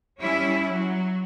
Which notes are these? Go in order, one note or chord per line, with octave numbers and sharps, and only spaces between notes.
G3 C#4 E4
F#3